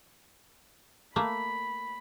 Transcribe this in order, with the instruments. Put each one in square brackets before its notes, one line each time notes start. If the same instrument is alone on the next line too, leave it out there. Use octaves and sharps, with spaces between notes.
[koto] A3 A#3 [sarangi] B5